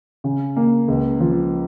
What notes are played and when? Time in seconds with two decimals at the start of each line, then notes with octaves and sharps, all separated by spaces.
0.24 C#3
0.56 A#3
0.88 C#2
1.20 F3